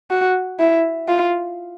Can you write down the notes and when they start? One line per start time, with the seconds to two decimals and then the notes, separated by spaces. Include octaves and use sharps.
0.11 F#4
0.59 E4
1.08 F4